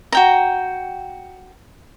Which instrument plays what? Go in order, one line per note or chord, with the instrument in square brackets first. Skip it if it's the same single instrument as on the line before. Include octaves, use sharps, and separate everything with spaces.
[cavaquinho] F#4 G5 A#5